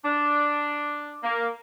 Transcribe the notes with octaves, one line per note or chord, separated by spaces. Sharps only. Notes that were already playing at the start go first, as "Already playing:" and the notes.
D4
A#3